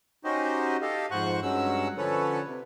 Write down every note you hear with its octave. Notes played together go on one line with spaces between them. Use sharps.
C#4 D#4 F#4 G4 C5 D#5
G4 A4 D#5 F5
F2 G#2 C5 F#5 C#6 F#6
G2 F#3 G#3 C#4 F#5 E6
D3 F3 C#4 A4 B4 C#5
C3